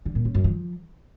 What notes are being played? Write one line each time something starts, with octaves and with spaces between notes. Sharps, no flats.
D3
A#2
C#3
F#2
F3